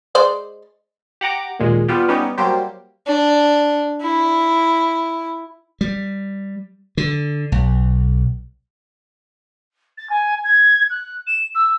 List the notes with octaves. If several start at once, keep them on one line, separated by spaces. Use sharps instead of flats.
G#3 C5 D5
G4 F#5 A#5 D6
D#2 A#2 G#3
G3 B3 F4 G4
G3 B3 C#4 D#4 G4
F#3 G3 A#3 G4 C5
D4
E4
G3
D3
B1
A6
G#5
G#6
F#6
E7
E6